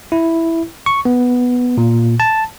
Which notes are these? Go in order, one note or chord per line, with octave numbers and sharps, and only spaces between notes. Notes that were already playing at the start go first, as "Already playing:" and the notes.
E4
C#6
B3
A#2
A5